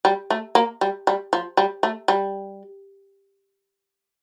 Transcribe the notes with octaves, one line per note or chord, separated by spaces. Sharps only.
G3
A3
A#3
G3
G3
F3
G3
A3
G3